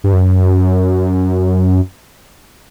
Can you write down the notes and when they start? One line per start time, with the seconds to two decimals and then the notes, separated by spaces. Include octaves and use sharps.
0.04 G2
0.13 F#2